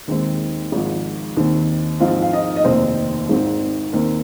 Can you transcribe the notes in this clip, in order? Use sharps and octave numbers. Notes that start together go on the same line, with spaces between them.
D#2 D#3 G#3 C4
G#1 G#2 F3
D#2 D#3 C4
G#2 F3 G#3 C4 F4 F5
F5
D#4 D#5
D#5
F1 D#2 D#3 A#3 C4 C5
G#1 G#2 D#3 C4
D#2 D#3 A#3 C4 A#4